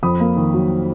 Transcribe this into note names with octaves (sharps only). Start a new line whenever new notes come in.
F2 B5 D#6
A#3
D#3
F#3